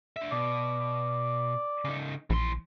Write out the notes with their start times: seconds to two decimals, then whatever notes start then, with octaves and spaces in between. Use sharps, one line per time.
0.16 D4 E5
0.32 B2 D5
1.85 C#3 D#4
2.30 A#1 E3 C6